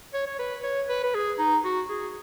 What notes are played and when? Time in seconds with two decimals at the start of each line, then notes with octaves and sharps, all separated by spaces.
0.14 C#5
0.26 C#5
0.39 B4
0.63 C#5
0.89 B4
1.03 B4
1.14 G#4
1.39 D#4
1.64 F#4
1.89 G#4